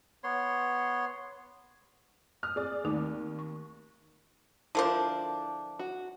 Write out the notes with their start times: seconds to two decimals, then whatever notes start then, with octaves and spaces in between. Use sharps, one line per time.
0.24 B3 C#5 C6
2.43 D#6 F6
2.56 C4 G#4 D5
2.84 D#2 A3 D#4 D6
2.97 C4
3.39 C#6
4.75 D3 F3 D4 E4 A#4 C5
5.79 F#4